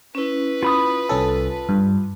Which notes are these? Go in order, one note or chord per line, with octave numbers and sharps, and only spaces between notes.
C#4 E4 B4
F4 B5 D#6
C2 C#4 A4 A5
G2